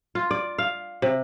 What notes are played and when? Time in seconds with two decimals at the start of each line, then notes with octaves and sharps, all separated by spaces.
0.15 F4
0.31 D5
0.58 F5
1.02 C3